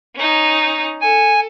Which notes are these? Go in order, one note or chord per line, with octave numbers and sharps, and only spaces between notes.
C#4 D#4
A4 G#5